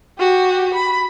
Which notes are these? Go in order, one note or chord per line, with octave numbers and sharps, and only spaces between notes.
F#4 G4
B5